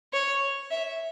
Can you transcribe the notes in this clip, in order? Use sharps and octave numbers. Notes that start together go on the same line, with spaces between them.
C#5
E5